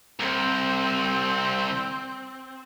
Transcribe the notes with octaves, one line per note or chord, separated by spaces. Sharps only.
C2 C4